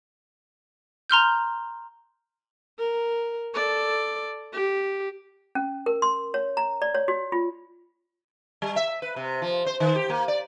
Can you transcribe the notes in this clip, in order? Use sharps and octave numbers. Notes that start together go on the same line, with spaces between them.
A#5 C6 F6 G6
A#4
A4 D5
G4
C#4
A#4
C6
C#5
A#5
D5
C#5
F#4
F4
G3
E5
B4
C3
F3
C5
D#3
G4
A#3
D5